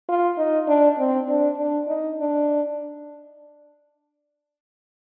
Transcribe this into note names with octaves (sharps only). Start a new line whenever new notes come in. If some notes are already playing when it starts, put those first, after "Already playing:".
F4
D#4
D4
C4
D4
D4
D#4
D4